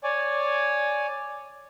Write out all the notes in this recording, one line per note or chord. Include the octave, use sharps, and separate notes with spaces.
C#5 D5 G#5